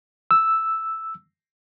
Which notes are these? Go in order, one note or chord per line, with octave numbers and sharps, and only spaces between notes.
E6